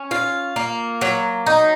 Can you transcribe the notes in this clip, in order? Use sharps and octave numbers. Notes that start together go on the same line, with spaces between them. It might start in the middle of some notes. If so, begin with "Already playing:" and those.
Already playing: C#4
F4
A#3
F#3
D#4